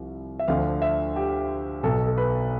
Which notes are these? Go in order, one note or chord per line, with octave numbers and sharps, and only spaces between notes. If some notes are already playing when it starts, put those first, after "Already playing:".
Already playing: C2 C3 F3
E5
D2 D3 F3 F5
E5
G4
B1 B2 A4
A4
B4